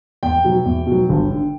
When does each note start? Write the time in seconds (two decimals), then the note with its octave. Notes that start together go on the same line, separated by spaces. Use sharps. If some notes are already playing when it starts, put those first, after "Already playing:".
0.23 E2 G5
0.44 B2 F#3
0.65 E2
0.87 B2
0.92 F#3
1.09 G1
1.30 D3